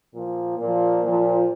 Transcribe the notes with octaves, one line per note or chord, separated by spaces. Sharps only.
A#2 F3
A#2 F3
A#2 F3